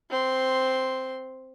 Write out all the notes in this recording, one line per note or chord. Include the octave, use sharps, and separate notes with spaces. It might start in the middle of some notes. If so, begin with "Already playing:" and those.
C4 C6